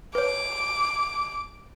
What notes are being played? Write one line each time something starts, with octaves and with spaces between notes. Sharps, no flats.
B4 C#5 D6